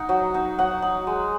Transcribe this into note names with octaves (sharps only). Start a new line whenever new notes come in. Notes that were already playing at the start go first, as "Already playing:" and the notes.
Already playing: D#4 F#5
F#3
D#4
F#3 F#5
D#4
G#3